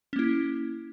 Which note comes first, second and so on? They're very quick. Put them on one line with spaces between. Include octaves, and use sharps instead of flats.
C#4 A#3 E4